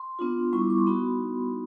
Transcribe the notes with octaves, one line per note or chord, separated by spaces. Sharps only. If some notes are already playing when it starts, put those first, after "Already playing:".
Already playing: C6
B3 D4 F4
G3 B3 E4 C#6
D6
C#6
C6
B3 D#4 F#4 B5